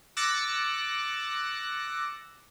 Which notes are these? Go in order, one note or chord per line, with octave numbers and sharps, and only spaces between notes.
D6 E6 F#6 A6 A#6 C#7